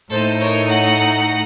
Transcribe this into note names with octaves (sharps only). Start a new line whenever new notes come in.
A2 A3 D#4 A4 C5
A#4 C#5
F#5 A#5